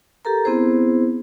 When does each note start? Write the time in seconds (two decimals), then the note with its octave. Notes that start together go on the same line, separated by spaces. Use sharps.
0.25 G4 A4 A#4 A#5
0.45 B3 C4 E4 G#4 C5